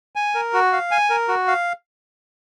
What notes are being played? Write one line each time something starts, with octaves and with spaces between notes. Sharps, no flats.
G#5
A#4
F#4
F5
G#5
A#4
F#4
F5